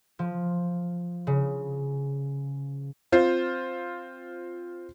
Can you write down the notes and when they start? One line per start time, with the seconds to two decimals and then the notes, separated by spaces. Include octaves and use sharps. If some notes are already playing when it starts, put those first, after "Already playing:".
0.19 F3
1.27 C#3
3.12 C4 F4 C5